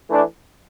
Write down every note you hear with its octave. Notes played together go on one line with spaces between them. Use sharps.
E3 A3 D4